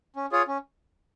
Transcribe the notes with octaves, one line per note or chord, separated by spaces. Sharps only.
C#4
F4 G#4 C#5
C#4